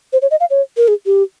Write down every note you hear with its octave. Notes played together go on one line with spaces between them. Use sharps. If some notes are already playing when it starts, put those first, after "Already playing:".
C5
C#5
D#5
F5
C#5
A#4
G#4
G4